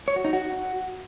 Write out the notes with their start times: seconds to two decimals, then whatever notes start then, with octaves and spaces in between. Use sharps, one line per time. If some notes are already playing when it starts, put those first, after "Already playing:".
0.08 C#5
0.16 F#4
0.25 D#4
0.33 F#4